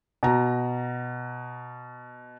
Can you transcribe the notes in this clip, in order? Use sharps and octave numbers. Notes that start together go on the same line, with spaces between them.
B2 A#5